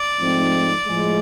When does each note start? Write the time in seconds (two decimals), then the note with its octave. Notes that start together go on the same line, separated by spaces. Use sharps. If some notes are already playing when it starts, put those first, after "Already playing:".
Already playing: D5
0.18 G#2 F3 A3 C4 D#4
0.88 A2 F3 G#3